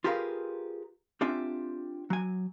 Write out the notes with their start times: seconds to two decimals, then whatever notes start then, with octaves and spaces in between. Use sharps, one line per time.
0.04 F4 G4 G#4 A#4 B4 F5
1.21 C4 D4 F4 G4 E5 G#5
2.10 F#3 G#5